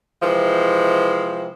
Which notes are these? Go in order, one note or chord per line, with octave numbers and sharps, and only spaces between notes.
C3 E3 F3 G#3